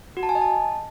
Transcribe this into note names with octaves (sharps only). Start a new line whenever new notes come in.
F#4
A5
G#5
D#5
A5